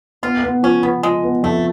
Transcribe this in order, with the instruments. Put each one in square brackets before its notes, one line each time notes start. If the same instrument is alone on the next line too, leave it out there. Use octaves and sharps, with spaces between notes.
[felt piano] B3 [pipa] F4
[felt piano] B3
[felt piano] F3 [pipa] C#4
[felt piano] F3 [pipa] B3
[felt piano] F3 [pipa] G#3
[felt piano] B3
[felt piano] F2 [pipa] A3